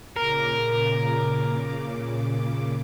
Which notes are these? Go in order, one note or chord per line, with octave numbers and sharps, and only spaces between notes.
A#2 C#3 A#4 D6